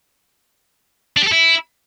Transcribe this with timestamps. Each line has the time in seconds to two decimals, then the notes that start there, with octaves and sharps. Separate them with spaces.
1.17 D4
1.22 G4
1.27 A4
1.32 E4